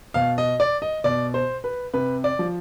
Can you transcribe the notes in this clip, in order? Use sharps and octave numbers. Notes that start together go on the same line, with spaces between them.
B2 F5
D#5
D5
D#5
B2 D5
C5
B4
C3 B4
D5
F3